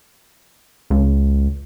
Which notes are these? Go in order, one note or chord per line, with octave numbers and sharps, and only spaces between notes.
C#2